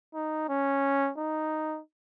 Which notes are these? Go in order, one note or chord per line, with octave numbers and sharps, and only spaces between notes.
D#4
C#4
D#4